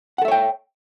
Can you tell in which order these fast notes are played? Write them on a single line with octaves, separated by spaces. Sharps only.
F#5 A4 E5 C#5 G5